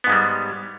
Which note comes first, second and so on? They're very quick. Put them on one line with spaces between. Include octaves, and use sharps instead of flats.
B3 G#2 G#3 G3